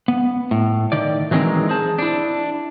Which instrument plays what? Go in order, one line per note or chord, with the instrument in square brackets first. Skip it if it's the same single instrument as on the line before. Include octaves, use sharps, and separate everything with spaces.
[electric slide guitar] B3
A2
D#3 D5
E3 F#3 G#3 C4 D#4 A#4
G#4 C5 A5
D4 E4